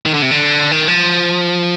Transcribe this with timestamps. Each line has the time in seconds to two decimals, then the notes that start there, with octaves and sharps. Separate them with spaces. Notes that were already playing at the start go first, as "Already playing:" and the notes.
0.06 D#3
0.14 D3
0.22 C3
0.31 D3
0.71 D#3
0.88 F3